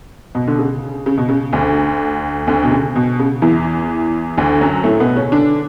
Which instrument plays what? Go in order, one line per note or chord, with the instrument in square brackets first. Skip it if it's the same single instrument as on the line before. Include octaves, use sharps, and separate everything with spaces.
[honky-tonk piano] B2
D3
C#3
C#3
B2
C#3
D2 D3
D2 D3
B2
C#3
B2
C#3
E2 E3
D2 D3
F#2 F#3
A2 A3
B2 B3
C#3 C#4
D3 D4